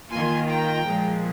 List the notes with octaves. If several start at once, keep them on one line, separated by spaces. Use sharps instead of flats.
D#3 A#3 F4 G#5 C6
G5 A#5
A#2 F3 G#3